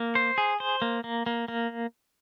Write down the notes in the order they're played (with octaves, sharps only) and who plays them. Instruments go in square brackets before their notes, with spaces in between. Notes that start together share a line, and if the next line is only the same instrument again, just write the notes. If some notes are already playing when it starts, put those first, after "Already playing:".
Already playing: [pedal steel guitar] A#3
C5
G#4
C5
A#3
A#3
A#3
A#3